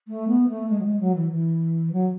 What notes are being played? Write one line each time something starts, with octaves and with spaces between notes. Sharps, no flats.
A3
B3
A3
G#3
F#3
G#3
F#3
E3
E3
F#3